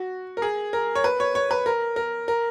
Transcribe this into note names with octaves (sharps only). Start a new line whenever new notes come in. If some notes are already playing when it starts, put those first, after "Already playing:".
Already playing: F#4
A#4
G#4
A#4
C#5
B4
C#5
C#5
B4
A#4
A#4
A#4